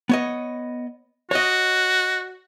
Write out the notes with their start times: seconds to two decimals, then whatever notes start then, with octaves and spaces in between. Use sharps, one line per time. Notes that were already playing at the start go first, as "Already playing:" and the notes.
0.09 B3 C#5 D#5
1.31 F#4 C#5 D#5